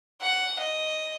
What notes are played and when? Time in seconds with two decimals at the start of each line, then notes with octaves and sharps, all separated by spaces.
0.22 F#5
0.59 D#5